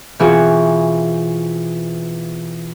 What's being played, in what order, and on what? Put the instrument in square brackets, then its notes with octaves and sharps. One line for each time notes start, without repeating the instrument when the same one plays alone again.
[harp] B2 E3 C4 F4 F#4 G#4